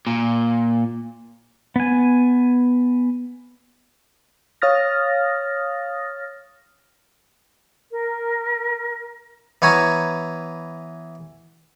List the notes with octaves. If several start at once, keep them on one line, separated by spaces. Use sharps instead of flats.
A#2
B3 G#5
C#5 F5 D#6 F6 A6 A#6
A#4
E3 B3 C#5 G#5 A#5